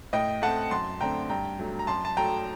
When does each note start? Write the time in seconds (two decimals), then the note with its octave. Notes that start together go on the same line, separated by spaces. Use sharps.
0.13 A2 D#5 G5
0.42 A3 C4 F#5 A5
0.71 F#2 A5 C6
1.01 D3 A3 C4 G5 A#5
1.29 G2 G5 A#5
1.59 F#3 A3
1.79 A#5
1.87 F#2 A5 C6
2.05 A5
2.17 F#3 A3 G5 A#5